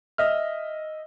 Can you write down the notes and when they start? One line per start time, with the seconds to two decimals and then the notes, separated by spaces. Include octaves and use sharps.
0.18 D#5 E5 F6